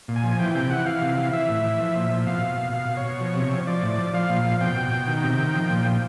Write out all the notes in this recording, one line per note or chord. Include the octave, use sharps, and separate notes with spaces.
A#2
G#5
F3
E3 G5
C3 G5
E3 F#5
E3 F5
C3
E3
E3 E5
A2
E3
F3
A#2
F3
B2 F5
B2
B2
B2 F5
B2
C#5
B2
F3
C3
F3
F3 D5
A2
F3
F3 F5
A#2
F3
B2 G5
B2
B2
D#3
C3
D#3
F3
A#2
F3